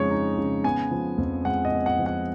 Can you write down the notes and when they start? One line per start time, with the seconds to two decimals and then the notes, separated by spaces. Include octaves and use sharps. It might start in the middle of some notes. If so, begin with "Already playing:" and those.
Already playing: F2 C#3 G#3 D#4 C#5
0.11 D#4
0.38 C#3
0.64 B3 G#5
0.91 F3
1.18 F2
1.45 G#3 F#5
1.65 D#5
1.72 B3
1.86 F#5
1.99 F3
2.06 F#5